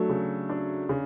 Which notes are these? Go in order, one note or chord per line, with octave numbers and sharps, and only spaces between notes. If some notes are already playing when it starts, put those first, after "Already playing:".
Already playing: F#3 A3 D4
C#3
D4
C#3